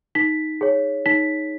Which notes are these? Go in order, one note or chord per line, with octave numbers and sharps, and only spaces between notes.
D#4 B6
G#4 C#5
D#4 B6